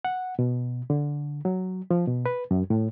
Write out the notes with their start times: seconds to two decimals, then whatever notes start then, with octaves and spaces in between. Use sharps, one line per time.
0.05 F#5
0.39 B2
0.90 D3
1.45 F#3
1.91 F3
2.07 B2
2.26 B4
2.51 F#2
2.70 A2